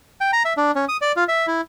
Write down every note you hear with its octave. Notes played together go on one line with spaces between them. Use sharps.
G5
A#5
E5
D4
C#4
D#6
D5
F4
E5
E4